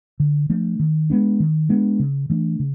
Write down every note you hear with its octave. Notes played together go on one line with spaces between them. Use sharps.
D3
F3 A3 D4
D#3
G#3 B3 D4
D#3
G#3 B3 D4
C#3
E3 A3 D4
C#3